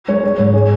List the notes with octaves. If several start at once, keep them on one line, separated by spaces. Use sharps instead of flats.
G#3 C#5
G#3 C#5
G#2
G#3 G#4